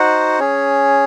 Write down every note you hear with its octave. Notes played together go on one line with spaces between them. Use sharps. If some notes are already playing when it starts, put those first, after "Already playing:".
Already playing: D#4 F#4 C5 F#5
C#4 G#4 C#5